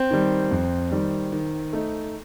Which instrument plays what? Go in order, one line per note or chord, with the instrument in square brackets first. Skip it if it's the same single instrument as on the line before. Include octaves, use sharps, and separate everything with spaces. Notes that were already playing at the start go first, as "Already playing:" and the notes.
Already playing: [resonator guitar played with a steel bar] C4
[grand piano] D#3 G3
F2
D#3 G3
D#3
A3 D#4